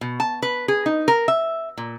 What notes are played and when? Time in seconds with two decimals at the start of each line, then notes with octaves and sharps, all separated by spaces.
0.01 B2
0.20 A5
0.42 B4
0.68 G#4
0.86 D#4
1.08 A#4
1.28 E5
1.78 A#2